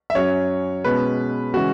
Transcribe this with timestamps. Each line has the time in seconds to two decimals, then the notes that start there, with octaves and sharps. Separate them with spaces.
0.10 E5
0.15 F#2 F#3 C#4 C#5
0.84 B2 G#3 C#4 B4
1.54 C#3 E3 G#3 C#4 F#4